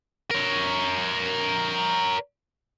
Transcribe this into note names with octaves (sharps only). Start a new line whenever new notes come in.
A#4 C#5